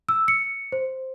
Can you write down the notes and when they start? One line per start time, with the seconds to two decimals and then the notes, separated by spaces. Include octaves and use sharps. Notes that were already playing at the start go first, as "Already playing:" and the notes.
0.09 E6
0.28 C#7
0.72 C5